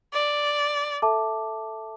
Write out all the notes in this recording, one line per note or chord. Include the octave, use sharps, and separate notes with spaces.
D5
A4 E5 A5 D6